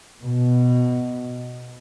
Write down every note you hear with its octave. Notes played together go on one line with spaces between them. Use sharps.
B2